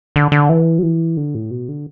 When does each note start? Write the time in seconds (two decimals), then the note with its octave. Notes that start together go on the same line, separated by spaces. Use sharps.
0.16 D3
0.32 D3
0.49 E3
0.79 F#3
0.83 E3
1.17 D3
1.35 A2
1.51 B2
1.69 D3